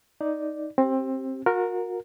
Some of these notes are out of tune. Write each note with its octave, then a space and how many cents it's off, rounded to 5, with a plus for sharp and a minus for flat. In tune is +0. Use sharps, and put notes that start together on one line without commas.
D#4 +0 D5 +0
C4 +20 G4 -10
F#4 -35 A#4 -5